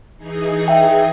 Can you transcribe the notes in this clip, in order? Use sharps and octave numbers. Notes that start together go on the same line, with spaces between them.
E3 D#4 G#4
E5 G5